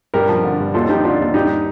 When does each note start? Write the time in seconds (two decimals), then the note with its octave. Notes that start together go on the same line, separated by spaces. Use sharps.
0.14 G2 G4 A#4
0.29 F3
0.43 D3
0.59 G2
0.74 D#2 F4 A4
0.89 F3 D#4 G4
1.04 D3 D4 F4
1.20 D#2
1.34 G2 D#4 G4